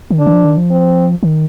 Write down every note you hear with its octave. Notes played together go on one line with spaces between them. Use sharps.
D#3
D3 D4
D#3
F3
D#3
F3
C4
D#3